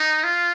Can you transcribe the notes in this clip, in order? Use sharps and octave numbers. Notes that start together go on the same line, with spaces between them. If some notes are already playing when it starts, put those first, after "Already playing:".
Already playing: D#4
F4